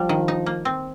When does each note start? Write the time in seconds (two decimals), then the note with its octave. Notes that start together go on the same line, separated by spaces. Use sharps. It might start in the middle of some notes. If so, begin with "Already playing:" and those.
Already playing: F3 G3
0.09 D#3
0.28 D#4
0.46 A#3
0.65 C4